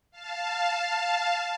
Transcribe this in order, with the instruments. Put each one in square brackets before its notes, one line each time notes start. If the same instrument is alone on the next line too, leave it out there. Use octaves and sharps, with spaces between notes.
[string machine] F5 A5